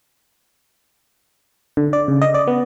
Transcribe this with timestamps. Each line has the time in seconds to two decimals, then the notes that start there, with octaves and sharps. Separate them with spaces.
1.77 D3
1.93 D5
2.08 C#3
2.22 D#5
2.34 D5
2.47 B3